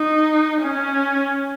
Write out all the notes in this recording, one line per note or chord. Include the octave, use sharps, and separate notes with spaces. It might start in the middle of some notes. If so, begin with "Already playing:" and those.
Already playing: D#4
C#4